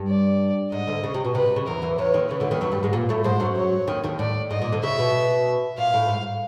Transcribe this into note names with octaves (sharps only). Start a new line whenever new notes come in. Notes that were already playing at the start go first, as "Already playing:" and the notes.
Already playing: G2
D5
G#2 D#5
D2 D3
C#3
C3
B2
C3 B4
C3
C#3
E2 E3 A#4
E2 E3
E2 E3 C#5
D#2 D#3
C#3 B4
D2 D3
D#2 D#3
F#2 F#3
G2 G3
G#2 G#3
A#2 A#3
A2 A3
G#2 G#3 C5
F#2 F#3
C#5
D#2 D#3
D#2 D#3
A2 D5
G#2 D#5
A#2
D2 D3
C#3 E5
B2
A#2 F5
A2
G#2